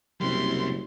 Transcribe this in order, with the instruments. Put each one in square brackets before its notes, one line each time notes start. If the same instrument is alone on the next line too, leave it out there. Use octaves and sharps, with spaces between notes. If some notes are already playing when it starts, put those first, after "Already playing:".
[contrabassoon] F#1 [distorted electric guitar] C3 G3 [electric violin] C6